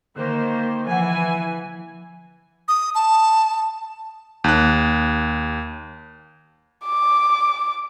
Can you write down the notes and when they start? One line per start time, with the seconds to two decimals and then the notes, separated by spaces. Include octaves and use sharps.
0.16 D3 D#3 A#3 C5
0.87 E3 F3 F#5 G#5
2.68 D#6
2.95 A5
4.44 D#2 F#6
6.86 D6